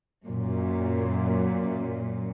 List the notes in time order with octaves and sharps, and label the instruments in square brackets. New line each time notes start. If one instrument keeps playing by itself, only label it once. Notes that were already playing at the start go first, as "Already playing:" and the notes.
[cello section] F#2 A#2